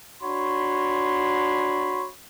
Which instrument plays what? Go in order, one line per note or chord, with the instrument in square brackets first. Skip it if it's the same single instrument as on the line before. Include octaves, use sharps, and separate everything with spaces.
[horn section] D4 F#4 C#5 B5 C6